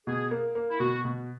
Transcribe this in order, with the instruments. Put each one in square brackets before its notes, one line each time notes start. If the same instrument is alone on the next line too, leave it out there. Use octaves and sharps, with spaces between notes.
[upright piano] B2 [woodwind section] G#4
[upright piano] A#3
A#3
[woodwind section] E4
[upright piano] B2 [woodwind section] F#4
[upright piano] B2